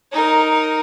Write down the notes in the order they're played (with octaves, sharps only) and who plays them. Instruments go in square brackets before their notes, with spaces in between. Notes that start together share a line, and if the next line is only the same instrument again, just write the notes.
[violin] D#4 A#4